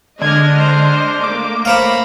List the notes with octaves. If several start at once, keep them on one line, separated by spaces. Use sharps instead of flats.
D3 G#3 D4 D#5 F6 G#6
C5 F6
A3 A#3 D6
C5 C#5 F5 A#5 B5